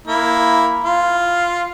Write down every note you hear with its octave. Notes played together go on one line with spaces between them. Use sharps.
A#3 E4
F4